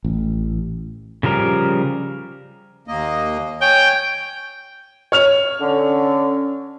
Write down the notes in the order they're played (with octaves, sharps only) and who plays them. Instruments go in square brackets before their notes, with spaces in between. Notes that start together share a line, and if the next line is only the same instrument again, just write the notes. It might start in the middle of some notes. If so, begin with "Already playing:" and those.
[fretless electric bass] A1
[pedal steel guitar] C#3 F3 G3 A#4
[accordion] D#2 A#3 D#5
[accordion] C#5 G#5 [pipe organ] G5
[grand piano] C#5 F6 F7
[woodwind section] D3 [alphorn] C#4